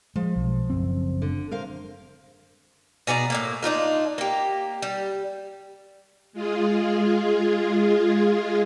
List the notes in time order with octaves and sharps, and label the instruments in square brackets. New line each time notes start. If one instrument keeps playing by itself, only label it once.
[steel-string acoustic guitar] F3 [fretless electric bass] G#3
[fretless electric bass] B1
F#1 F#2 C4
[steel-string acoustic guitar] D3
A#4 C5 F5
[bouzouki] B2 G#4 D5 A#5
A2 C#3 A#3
D4 D#4 F4 A#4
A#3 G4
G3
[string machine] G#3 F4 G#4